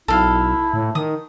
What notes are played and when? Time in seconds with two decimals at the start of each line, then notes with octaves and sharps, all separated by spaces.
0.08 B1 E4 A4 F5
0.73 A2
0.95 D#3 D#6